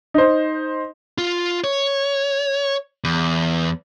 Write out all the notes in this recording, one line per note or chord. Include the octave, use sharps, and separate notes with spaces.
D#4 C5
F4
C#5
E2